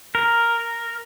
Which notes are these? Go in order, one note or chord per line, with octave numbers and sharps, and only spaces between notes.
A#4